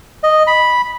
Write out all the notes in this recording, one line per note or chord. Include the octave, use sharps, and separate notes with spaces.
D#5
B5